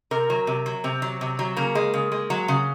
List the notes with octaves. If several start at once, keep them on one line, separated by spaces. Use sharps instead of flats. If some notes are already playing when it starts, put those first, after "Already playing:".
C3 A#4
F#3
C3
F#3
C3 C4
F#3
C3
F#3
C#3 A#3
G#3
C#3
G#3
F#3
C#3